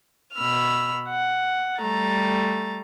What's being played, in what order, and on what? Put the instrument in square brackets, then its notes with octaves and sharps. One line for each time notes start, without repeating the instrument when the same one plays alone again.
[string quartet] B2 B5 E6 F6
F#5
G3 A3 A#5 A6